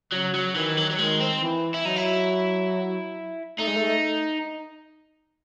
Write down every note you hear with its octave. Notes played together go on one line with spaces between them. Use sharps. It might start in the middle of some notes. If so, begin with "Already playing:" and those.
C#3 F#3
F#3
D#3 E3
F#3
F#3
D#3 G#3
C4
E3
E4
F#3 D#4
E4
A3 D#4
G#3
A3